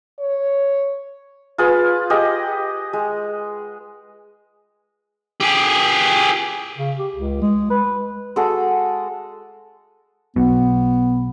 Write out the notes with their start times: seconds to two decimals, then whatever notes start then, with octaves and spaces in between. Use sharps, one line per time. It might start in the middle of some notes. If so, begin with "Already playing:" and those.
0.19 C#5
1.58 F4 G#4 B4
2.10 G4 G#4 D#5 F#5
2.93 G#3
5.41 G4 G#4
6.78 C#3
6.98 G4
7.15 C#2
7.42 G#3
7.70 B4
8.36 G#3 F#4 A4
10.36 B1 B2 B3